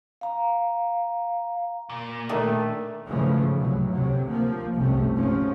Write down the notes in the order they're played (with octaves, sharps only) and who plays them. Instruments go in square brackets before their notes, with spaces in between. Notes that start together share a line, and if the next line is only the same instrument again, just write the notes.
[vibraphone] F5 A#5
[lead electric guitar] A#2
[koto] D#3 D4 [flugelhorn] A3
[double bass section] G#2 C#3 E3 F3 G#3 A3
C2 G#2 C3 F#3
D2 C3 F#3
F3 A#3
G1 C2 G#2 C3 A3 C#4
G#2 F3 C#4